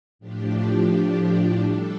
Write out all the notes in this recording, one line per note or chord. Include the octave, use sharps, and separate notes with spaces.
A2 F3 D4 G4
G3 D4 A4